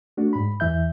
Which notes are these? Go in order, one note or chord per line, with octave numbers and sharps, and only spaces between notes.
A3 D4 F#4
G#2 B5
E2 E3 E5 G6